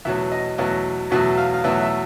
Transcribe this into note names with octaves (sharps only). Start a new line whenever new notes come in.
E2 B2 F#3 A3 C#4 E5
D#5
E2 B2 F#3 A3 C#4
E2 B2 F#3 A3 C#4 E5
F5
F5
E2 B2 F#3 A3 C#4 E5
E5